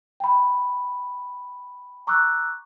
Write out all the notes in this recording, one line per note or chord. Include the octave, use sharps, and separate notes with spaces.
G5 B5
A#5 C#6 D6 E6 F#6